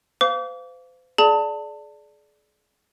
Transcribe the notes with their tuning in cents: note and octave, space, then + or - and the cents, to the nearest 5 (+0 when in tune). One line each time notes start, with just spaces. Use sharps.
C5 -40 F5 -5 D6 -35
G#4 +35 D5 +0 A5 +25